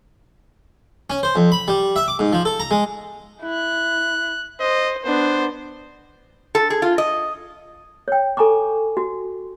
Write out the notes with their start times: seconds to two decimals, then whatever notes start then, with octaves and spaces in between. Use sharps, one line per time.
1.10 C#4
1.23 C5
1.36 F2
1.52 B5
1.68 G3
1.96 E5
2.08 D6
2.19 G#2
2.33 F3
2.45 A4
2.60 A#5
2.71 G#3
3.41 E4 F#6
4.60 C5 D#5
5.05 B3 D4 C5
6.55 A4
6.70 G#4
6.82 F4
6.98 D#5
8.08 C#5 G5
8.37 A4 G#5 A#5 C#6 D6
8.97 F#4